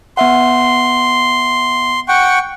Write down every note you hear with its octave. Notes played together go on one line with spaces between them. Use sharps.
B3 E5 F#5 C6
F#5 G5 C#6